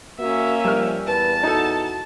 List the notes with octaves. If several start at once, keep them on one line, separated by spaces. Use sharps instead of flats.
A#3 C#4 F#4 E5
F3 G3 A#4 F6
E2 B4 A5
D#4 F#4 A4